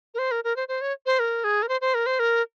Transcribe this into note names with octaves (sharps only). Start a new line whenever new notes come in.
A#4
C5
A#4
A#4
C5
C5
C#5
C5
A#4
G#4
A#4
C5
C5
A#4
C5
A#4